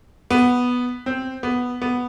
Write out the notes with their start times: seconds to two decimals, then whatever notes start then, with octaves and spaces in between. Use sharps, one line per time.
0.31 B3
1.06 C4
1.43 B3
1.82 B3